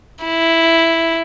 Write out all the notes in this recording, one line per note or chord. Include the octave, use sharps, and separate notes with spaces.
E4